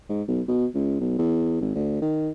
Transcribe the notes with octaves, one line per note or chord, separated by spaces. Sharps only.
G#2
B1
B2
C#2
B1
E2
G#1
D2
D#3